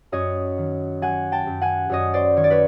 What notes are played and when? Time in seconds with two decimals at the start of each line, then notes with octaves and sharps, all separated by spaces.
0.12 F#2 C#5 D#5
0.58 D#3
1.02 F#3 F#5 G#5
1.32 G5 A5
1.47 F#2
1.61 F#5 G#5
1.89 F#2 C#5 D#5
2.14 C5 D5
2.36 D#3 C#5
2.44 D5
2.50 B4 C#5